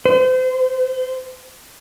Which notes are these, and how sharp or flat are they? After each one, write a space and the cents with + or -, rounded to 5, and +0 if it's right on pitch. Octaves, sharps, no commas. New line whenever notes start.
C5 -35